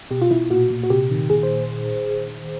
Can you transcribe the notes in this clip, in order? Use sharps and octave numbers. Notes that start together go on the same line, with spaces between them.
B2 G4
F4
B2 E4
A#2 F#4
A#2
F#4
C3 G4
D#3
A#2 G#4
C5